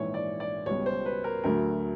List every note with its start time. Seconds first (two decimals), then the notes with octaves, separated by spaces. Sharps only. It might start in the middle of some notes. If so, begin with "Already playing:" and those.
Already playing: A#1 G#2 E3 C#5
0.14 D5
0.40 D5
0.66 C#2 B2 G3 C#5
0.86 C5
1.06 B4
1.24 A#4
1.44 D2 D3 F#3 A3 A#4